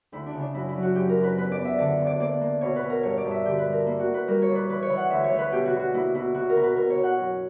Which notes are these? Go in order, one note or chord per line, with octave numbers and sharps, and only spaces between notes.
D2 E4
D4
C#3
D4
F#2 E4
E4
F#3
F#4
F#2 G4
A#4
F#2
B4
E2 B4
D5
B3
E5
D3 D5
E2
D5
A#3 D5
A#3
B2 C#5
B4
B2
A#4
G2 C#5
D5
G2
E5
D3 G4
B4
G3
A#4
A#3 E4
F#4
A#3
B4
G3 A#4
C#5
A#2
B4
E3 B4
C#5
E3
F#5
D2 E5
C#5
D2
B4
B2 G4
F#4
B2
F#4
A#3 E4
B2 E4
B2 F#4
A#4
B2
B4
B2 A#4
C#5
B2
F#5
F#2